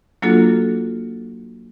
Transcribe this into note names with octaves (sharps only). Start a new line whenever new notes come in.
F#3 A#3 D4 F4 F#4 A4